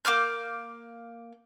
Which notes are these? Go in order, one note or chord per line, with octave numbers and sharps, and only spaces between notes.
A#3 D6 F6 G6